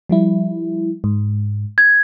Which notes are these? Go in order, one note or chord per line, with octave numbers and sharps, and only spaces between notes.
F3 G3 E4
G#2
G#6